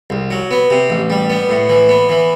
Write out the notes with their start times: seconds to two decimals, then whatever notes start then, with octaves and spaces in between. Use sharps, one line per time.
0.10 C2
0.31 F#3
0.51 B3
0.70 C3
0.90 A1
1.10 G3
1.30 B3
1.49 A2
1.69 E3
1.89 B3
2.09 E3